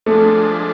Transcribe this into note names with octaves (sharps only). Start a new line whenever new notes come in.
F3 G#3 A3 D4